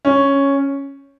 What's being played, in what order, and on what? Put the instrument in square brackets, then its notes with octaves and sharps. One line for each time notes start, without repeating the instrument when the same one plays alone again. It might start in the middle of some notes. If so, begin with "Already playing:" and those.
[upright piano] C#4